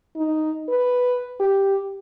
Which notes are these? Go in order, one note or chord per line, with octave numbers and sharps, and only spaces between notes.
D#4
B4
G4